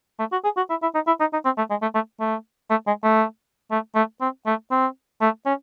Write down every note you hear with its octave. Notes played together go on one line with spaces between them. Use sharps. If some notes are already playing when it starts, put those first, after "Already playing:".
A3
F#4
G#4
F#4
E4
E4
D#4
E4
D#4
D#4
C4
A3
G#3
A3
A3
A3
A3
G#3
A3
A3
A3
C4
A3
C4
A3
C#4